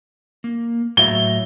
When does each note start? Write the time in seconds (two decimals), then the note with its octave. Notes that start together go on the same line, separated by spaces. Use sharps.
0.44 A#3
0.97 A2 F#3 E5 G7